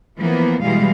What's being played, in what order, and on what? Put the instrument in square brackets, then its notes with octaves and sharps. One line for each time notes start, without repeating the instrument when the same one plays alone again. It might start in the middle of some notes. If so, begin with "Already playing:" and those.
[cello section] E3 F3 A#3 B3
B2 E3 G3 G#3 F5